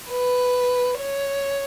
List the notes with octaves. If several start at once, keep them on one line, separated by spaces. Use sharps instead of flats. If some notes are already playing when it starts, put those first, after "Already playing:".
B4
C#5